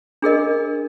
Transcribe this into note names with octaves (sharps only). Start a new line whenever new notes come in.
D4 G#4 A#4 D#5